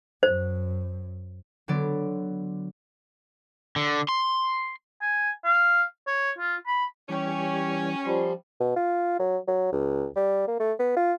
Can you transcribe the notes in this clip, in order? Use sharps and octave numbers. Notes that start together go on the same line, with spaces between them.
F#2 C5
D3 F#3 B3 D5
D3
C6
G#5
F5
C#5
F4
B5
E3 G3 C#4 G4 C#5
F3 G3 C6
B2
F4
F#3
F#3
C#2
G3
A#3
A3
B3
F4